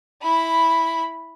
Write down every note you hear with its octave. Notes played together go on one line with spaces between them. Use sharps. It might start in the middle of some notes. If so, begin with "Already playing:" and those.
E4 B5